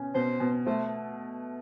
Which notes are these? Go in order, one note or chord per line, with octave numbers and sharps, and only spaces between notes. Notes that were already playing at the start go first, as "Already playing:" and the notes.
Already playing: B2 C#4
B2 C5
B2
A3 C5